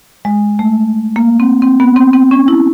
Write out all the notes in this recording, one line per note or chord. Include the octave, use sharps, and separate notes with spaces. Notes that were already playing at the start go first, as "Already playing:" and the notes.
G#3
A3
A#3
C4
C4
B3
C4
C4
C#4
E4